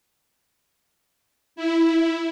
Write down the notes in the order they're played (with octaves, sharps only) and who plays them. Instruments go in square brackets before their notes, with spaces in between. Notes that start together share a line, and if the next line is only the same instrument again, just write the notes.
[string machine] E4